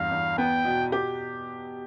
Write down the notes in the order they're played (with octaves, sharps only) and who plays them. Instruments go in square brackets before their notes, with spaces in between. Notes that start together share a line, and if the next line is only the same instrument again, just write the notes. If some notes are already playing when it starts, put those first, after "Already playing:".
Already playing: [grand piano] E2 G2 [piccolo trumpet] F5
[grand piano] E2
[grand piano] B3 [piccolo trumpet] G5
[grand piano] B2
G4